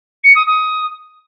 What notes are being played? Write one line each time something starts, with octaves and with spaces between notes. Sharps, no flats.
C#7
D#6
D#6